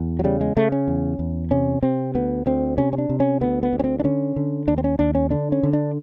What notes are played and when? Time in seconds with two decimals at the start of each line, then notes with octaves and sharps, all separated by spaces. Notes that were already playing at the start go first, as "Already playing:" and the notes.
Already playing: E2
0.19 F#3
0.24 C#3 G3
0.41 G#3
0.57 C#3 A3
0.72 C#4
0.88 E2
1.19 E2
1.51 C3 C#4
1.83 C3 C4
2.15 D2 B3
2.46 D2 C4
2.78 C3 C#4
2.93 C#4
2.98 D4
3.09 C3
3.20 C#4
3.41 D2 B3
3.63 B3
3.73 D2
3.79 C#4
3.84 C4
4.00 D4
4.04 D3 C#4
4.36 D3
4.67 D#2 D4
4.78 C4
4.84 C#4
4.99 D#2 D4
5.15 C#4
5.31 D3 D4
5.52 C#4
5.63 D3
5.73 D4